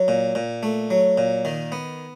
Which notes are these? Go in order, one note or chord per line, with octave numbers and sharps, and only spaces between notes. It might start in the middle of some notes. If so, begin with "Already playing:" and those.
Already playing: F#3
A#2
A#2
A3
F#3
A#2
D#3
B3